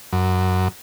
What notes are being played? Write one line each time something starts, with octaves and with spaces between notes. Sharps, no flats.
F#2